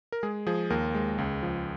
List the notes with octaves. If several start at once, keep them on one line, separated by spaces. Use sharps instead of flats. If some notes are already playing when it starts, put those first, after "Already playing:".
A#4
G#3 G#4
F3 G#4
D#2 A#4
G#3
C#2
F3